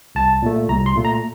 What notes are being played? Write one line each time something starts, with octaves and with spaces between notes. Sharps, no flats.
C2 A5
A#2 A3
C2 A#5
C6
A#2 A3
A#5